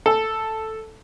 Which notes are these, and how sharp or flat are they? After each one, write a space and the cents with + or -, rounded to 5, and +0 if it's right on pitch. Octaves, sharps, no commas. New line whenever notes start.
A4 +0 A5 +0